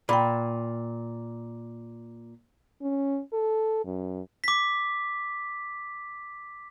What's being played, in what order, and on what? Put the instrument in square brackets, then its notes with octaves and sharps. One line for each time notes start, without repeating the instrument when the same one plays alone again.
[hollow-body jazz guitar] A#2 [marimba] G5 B5
[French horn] C#4
A4
F#2
[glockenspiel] D6 B6